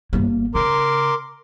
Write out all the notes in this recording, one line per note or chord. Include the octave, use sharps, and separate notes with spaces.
G1 A#3
C#3 A#4 C6 D6